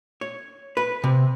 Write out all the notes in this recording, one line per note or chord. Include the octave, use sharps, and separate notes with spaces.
C#5
B4
C3